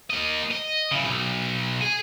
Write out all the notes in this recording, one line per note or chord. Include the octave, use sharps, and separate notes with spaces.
A#3 D#5
D#5
C#3 E4
B1
G#4